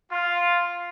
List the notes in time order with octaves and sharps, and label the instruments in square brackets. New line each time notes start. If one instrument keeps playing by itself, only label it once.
[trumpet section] F4